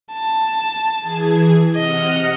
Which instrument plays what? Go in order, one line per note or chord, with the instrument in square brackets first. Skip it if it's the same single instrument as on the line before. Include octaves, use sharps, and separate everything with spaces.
[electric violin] A5
[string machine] E3 G#4 G#5
[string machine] C3 F#5 F6 [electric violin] D#5